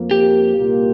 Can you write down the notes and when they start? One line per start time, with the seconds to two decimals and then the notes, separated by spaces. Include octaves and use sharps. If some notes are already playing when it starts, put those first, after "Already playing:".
Already playing: F2 F3 A#3
0.11 G4
0.55 C2 A#2 A#3 F4